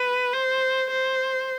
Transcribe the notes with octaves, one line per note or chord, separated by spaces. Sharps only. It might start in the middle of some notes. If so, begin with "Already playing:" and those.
Already playing: B4
C5
C5